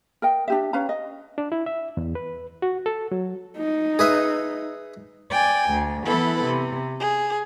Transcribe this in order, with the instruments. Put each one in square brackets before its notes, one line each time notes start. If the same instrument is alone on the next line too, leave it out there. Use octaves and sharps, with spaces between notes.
[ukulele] A#4 D#5 G5
D4 G4 E5
C#4 B4 F5 A#5
D#5
[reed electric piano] D4
E4
E5
E2
B4
F#4
A4
F#3
[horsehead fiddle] D#4
[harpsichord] G#4 B4 E5
[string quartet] D5 G5 G#5
D2
E3 B3 E4 A4 B4
C3
G#4